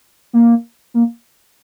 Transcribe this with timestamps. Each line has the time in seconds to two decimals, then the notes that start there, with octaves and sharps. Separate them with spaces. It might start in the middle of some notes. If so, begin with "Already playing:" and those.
0.33 A#3
0.94 A#3